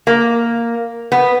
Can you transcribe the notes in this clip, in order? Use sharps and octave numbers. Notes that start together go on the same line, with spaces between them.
A#3
B3